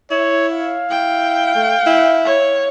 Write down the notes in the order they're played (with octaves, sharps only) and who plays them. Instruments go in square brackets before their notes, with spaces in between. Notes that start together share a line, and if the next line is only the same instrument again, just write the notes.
[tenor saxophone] E4 [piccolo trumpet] C#5
[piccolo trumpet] F5
[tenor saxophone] E4 [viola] G5
[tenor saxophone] A3
E4
[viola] C#5